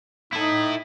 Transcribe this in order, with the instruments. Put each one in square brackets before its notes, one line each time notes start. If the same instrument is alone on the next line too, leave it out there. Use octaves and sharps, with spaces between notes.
[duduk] D#4 [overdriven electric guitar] E4 A4